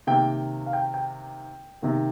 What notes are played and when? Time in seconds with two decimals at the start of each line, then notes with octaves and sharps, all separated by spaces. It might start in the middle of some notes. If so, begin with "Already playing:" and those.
0.07 C3 D#3 A#3 G5
0.66 F5
0.73 G5
0.94 G5
1.82 C3 D#3 A#3